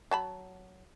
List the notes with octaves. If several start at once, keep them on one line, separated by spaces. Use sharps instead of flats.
F#3 A5 B5